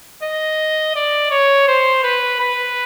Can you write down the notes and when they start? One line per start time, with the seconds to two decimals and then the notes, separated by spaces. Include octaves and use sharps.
0.23 D#5
0.96 D5
1.31 C#5
1.68 C5
2.04 B4
2.40 B4